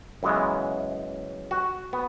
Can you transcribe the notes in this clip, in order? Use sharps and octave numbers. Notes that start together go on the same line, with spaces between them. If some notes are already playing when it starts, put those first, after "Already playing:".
F#2 C#3 E3 G#3 B3
F#4
B3